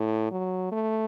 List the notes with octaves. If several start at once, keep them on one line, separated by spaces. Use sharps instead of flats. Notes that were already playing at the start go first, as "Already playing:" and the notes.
Already playing: A2
F#3
A3